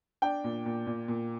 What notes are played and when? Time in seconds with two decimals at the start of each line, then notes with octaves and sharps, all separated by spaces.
0.22 D4 G5
0.44 A#2
0.65 A#2
0.87 A#2
1.08 A#2